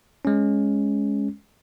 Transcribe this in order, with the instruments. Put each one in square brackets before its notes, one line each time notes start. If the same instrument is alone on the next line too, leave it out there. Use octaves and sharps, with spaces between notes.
[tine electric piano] G#3 C#4